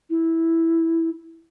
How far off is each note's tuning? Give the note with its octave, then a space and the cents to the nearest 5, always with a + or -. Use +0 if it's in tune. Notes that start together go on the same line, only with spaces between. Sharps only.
E4 -5